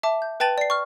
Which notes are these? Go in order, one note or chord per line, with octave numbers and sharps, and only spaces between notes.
E5 A5 D6
G6
B4 G5 A5 A6 D#7 F#7
D5 C7
C#6 F6